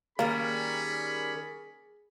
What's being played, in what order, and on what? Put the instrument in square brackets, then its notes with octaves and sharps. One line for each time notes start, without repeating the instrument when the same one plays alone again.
[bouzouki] D#3 G3 A#4 [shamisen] A#3 [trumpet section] C#4 D5 B5 [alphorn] G#4